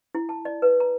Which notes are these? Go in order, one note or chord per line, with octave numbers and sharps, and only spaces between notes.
E4
A5
D5
B4
A#5